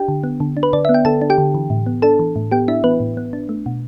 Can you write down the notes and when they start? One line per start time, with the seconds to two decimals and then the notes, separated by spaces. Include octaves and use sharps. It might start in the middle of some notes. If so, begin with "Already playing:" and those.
Already playing: D4 G4 G5
0.08 D3
0.24 B3
0.40 D3
0.57 D4
0.63 B4
0.73 D3 D5
0.85 B3 E5
0.94 G5
1.05 D3 A4 A5
1.22 D4
1.30 G4 G5
1.38 D3
1.55 E3
1.70 A2
1.86 B3
2.02 D4 A4 A5
2.19 E3
2.36 A2
2.51 B3 G4 G5
2.68 D4 E4 E5
2.84 E3 B3 B4
3.00 A2
3.17 B3
3.33 D4
3.49 A3
3.66 B2